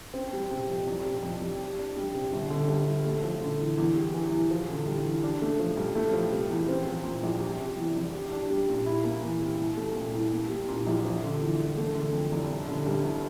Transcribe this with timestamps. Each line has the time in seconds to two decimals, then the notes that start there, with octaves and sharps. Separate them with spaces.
0.14 C4
0.33 G3
0.51 C3
0.69 F2
0.87 F1
1.05 C3
1.23 F2
1.41 F1
1.60 G4
1.78 D4
1.97 G3
2.14 C3
2.32 G1
2.50 D3
2.68 G2
2.87 G1
3.06 A3
3.23 F3
3.41 D3
3.59 E2
3.78 E2
3.95 G3
4.14 E3
4.32 E2
4.51 F3
4.69 D3
4.87 G2
5.04 A1
5.23 D4
5.42 A3
5.59 F3
5.77 G2
5.95 A3
6.13 F3
6.32 C3
6.50 E2
6.68 C4
6.87 F3
7.04 A#2
7.23 A#1
7.41 G3
7.60 C3
7.77 E2
7.96 F1
8.14 G4
8.32 D4
8.50 G3
8.69 A#2
8.86 E4
9.04 A#3
9.22 E3
9.40 C3
9.60 C2
9.77 A3
9.95 A#2
10.13 C2
10.32 A#3
10.49 G3
10.69 A#2
10.87 A#1
11.05 F3
11.23 D3
11.41 E2
11.59 E1
11.77 A3
11.95 D3
12.13 F2
12.32 F1
12.50 G1
12.68 D3
12.87 G2
13.04 G1